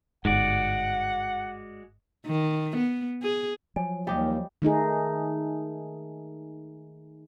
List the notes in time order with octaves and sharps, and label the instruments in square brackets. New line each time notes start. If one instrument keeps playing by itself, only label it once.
[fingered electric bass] G1 G#2 [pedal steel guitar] G#3 F#4 D5 [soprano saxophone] F#5
[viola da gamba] D#3
B3
G#4
[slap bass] F3 F#3 [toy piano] G#5
[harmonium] D#2 [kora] G3 G4 D#5 [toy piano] F5 G5
[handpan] D#3 A3 D#4 G#4